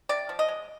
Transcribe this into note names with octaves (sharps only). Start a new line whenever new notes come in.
C3 D5
F3
D#5
G#3